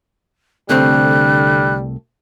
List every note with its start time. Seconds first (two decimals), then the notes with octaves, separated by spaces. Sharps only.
0.69 C2 D3 G3 A3 C4 F#6